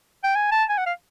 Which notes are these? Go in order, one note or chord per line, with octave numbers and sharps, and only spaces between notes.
G5
G#5
A5
G#5
F#5
F5